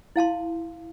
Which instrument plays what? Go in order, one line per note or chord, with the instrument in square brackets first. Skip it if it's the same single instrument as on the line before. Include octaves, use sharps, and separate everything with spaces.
[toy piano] E4 F5 A5 C6